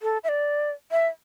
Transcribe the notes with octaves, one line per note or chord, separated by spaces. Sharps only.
A4
E5
D5
E5